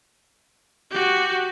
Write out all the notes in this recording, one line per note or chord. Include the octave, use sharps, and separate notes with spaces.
F#4 G4